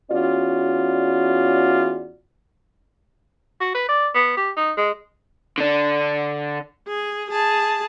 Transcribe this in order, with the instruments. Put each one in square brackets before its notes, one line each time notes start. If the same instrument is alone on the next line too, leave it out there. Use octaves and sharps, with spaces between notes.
[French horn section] E2 C#4 F4 F#4 D5
[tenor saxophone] F#4
B4
D5
B3
G4
D#4
G#3
[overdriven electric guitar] D3 D4
[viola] G#4
G#4 A5